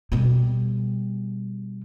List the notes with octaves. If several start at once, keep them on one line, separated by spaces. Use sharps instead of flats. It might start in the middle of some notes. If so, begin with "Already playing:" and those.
B2 G3